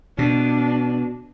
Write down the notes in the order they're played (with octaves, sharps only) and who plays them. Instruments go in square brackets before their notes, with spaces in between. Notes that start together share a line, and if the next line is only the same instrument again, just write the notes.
[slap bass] B2 [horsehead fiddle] D4